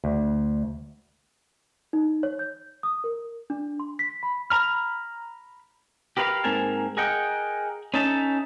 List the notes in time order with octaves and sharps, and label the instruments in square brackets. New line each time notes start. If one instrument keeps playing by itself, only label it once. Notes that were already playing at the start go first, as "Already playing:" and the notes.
[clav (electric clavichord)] D2
[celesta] D#4
C#5
G6
D#6
A#4
D4
C6
B6
B5
[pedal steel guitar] A#5 B5 F6
[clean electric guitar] G4 A#4 B4 D5 F5
G#2 A#3 C4 A#4 G#5 A5
G#4 A#4 D#5 F#5 G5
C#4 D#4 A4 E5 A5